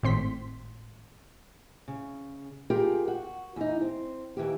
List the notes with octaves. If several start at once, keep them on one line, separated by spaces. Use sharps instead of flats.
G#1 A2 C4 C6 B6
C#3
F4 G4 G#4 A#4 G5
F#4
E2 D#4
C4
D#2 E3 A#3 G4